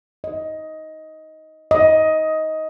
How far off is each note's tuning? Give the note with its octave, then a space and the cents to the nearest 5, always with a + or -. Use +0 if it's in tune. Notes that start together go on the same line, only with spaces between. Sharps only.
D#5 +10
D#5 +15